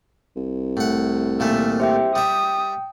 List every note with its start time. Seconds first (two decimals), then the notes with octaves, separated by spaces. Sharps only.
0.36 C2
0.77 A2 F#5
1.40 A#2 D#3 A3 E5
1.80 G4 C5 E5 G5
2.15 G3 E5 G5 D#6